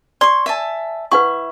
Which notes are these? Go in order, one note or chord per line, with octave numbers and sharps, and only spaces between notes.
D5 C6 C#6
E5 G#5 A5
E4 B4 F#5 C#6